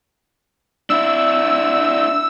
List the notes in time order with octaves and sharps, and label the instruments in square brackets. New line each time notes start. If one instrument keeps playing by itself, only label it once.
[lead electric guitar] D4 E4 [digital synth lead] E6